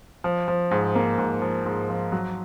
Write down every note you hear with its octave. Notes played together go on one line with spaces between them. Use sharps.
F3
F3
G#2
A#3
G#2
F3
G#2
F3
F#3